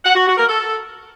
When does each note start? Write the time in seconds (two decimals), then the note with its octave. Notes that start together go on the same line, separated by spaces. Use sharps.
0.05 F#5
0.15 F#4
0.26 F#4
0.37 A#4
0.48 A4